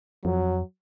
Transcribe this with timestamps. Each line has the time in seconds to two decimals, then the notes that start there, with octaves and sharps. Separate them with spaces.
0.25 F2 F#3